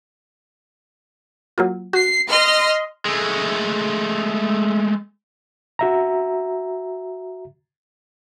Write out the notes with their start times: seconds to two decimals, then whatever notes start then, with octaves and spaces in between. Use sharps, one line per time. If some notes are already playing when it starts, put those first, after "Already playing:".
1.58 F#3 A#3 F4
1.93 F#4 C7
2.28 D#5 C6 F6
3.05 G#3 A3
5.79 F#4 E5 A#5